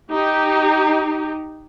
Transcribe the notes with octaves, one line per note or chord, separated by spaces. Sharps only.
D#4 G4